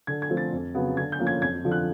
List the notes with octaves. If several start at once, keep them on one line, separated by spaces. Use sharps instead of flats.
D3 G#6
G#6
F3 A3 C4
A6
F2
C#3 F#3 B3
D3 G#6
G6
F3 A#3 C#4
G#6
F2 G#6
D3 F3
F#6